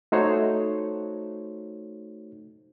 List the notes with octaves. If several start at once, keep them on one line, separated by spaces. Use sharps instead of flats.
A3 D#4 F#4 C5 C#5